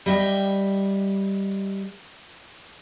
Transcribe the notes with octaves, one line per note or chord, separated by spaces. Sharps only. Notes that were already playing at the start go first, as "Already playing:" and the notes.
G3 D#5 E5 G5